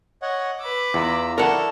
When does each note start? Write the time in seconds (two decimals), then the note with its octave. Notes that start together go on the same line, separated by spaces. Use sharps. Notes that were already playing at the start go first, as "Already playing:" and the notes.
0.22 C#5 D#5 F#5
0.60 B4 D6 E6
0.94 E2 F4 A#5 E6
1.38 D4 E4 A4 A#4 F#5 C#6